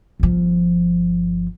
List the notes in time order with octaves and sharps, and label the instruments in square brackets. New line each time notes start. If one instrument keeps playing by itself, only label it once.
[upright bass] G1 F3